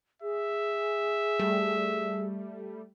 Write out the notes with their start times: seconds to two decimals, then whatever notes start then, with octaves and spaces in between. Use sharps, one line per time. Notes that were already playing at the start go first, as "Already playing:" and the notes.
0.22 G#4 E5
1.39 G3 A3